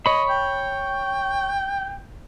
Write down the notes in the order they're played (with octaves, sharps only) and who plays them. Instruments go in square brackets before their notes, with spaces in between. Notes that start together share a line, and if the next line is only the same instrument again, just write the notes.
[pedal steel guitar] C#5 B5 [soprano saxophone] D#5
[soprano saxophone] G5